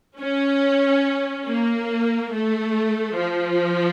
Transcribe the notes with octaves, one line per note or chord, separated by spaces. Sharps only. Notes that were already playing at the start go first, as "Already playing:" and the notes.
C#4
A#3
A3
F3